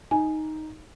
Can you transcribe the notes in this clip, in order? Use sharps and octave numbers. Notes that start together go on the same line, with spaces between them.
D#4 G#5